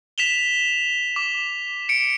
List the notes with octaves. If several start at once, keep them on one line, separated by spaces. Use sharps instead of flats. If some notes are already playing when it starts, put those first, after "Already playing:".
B6 E7 F7 G7
D6
C#7 D7